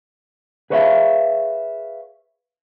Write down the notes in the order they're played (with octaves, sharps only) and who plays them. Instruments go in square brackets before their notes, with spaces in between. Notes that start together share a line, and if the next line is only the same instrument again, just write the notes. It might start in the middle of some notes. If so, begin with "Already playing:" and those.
[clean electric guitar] G#4 B4 C#5 D5 E5 F5